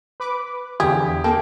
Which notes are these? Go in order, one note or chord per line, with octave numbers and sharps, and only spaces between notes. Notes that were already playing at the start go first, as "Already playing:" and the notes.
B4 D6
E2 D3 E3 G4 G#4
A#3 A4 G5